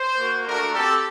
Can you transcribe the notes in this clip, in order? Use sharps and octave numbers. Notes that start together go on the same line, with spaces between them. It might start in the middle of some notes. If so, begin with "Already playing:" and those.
Already playing: C5
A#3 F#4
A3 D4 F#4 A#4
C4 G4 A4